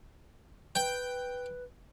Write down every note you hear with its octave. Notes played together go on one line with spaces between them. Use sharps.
B4 G5